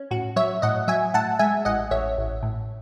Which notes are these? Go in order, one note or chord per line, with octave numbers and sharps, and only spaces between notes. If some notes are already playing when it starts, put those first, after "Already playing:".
Already playing: C#4
A2 F#4
F#3 C#5 E5
A2 D#5 F#5
F#3 E5 G#5
A2 F#5 A5
G#3 E5 G#5
A1 D#5 F#5
A1 C#5 E5
A1
A2